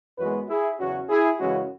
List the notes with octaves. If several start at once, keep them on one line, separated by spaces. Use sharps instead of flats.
F#2 E3 G#3 B3 F#4 B4
E4 G#4
E2 C#3 F#3 C#4 F#4
E4 G#4
F#2 C#3 E3 G#3 C#4 F#4